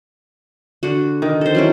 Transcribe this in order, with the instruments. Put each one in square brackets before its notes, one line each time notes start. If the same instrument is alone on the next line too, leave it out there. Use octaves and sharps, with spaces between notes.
[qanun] D3 F#4
[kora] D#3
[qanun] A4 C5
F#3 C#4 E4